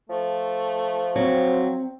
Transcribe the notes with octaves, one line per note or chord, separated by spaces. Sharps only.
F3 A3
F#3 C4